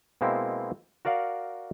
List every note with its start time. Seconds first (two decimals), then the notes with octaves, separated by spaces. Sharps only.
0.21 B2 G#3 A#3 C4 E4
1.05 F#4 A#4 D5 F5 F#5